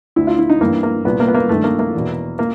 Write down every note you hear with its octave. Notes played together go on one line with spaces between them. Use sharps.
D2 D3 E4
F4
E4
D#4
G2 E3 A#3
A#3
C2 A#2 B3
A#3
B3
A#3
G2 D#3 A3
A#3
A#3
E2 B2
A#3